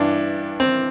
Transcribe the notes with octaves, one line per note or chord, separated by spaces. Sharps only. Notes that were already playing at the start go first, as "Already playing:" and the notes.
Already playing: G2 E3 D4
C4